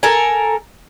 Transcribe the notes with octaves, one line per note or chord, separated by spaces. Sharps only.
A4 A#4 G#5